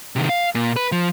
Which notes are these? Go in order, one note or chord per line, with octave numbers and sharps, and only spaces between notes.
C3 D#3
F5
A#2
B4
F3